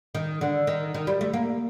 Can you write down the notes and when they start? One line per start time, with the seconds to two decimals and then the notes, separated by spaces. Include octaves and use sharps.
0.15 D#3
0.41 D3
0.67 D#3
0.94 D#3
1.07 G3
1.21 A3
1.34 A#3